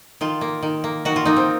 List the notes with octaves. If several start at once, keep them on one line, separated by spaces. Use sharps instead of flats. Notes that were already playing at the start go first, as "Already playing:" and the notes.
D#3 F4
A#3
D#3
A#3
D#3 F#4
F4
A#3 D#4
C4